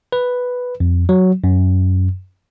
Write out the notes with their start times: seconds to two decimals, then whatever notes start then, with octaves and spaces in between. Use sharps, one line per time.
0.12 B4
0.80 F2
1.09 F#3
1.44 F#2